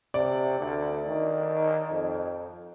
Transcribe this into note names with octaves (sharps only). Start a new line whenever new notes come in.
C3 D5
D2
D#3
F2